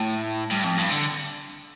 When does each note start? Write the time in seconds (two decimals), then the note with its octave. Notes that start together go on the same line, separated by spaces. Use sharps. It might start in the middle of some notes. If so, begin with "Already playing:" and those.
Already playing: A2
0.52 G2
0.64 F2
0.78 G2
0.91 D3